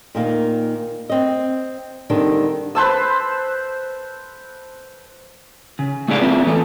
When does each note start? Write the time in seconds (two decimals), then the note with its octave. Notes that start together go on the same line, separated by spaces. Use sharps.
0.15 A#2 D#3 A#3
1.10 C4 D#5
2.10 D3 D#3 G3 C4 D4
2.75 B4 C5 A5 E6
5.79 C#3
6.08 A3 E4 G#4 D5 F5
6.21 C4 E4 F4 B4
6.46 E3 A3 A4